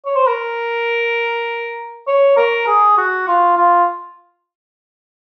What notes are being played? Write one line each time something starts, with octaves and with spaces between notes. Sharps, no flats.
C#5
C5
A#4
C#5
A#4
G#4
F#4
F4
F4